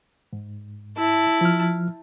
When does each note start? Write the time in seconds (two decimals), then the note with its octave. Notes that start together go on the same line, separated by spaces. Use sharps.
0.33 G#2
0.97 E4 A5
1.41 F3 F6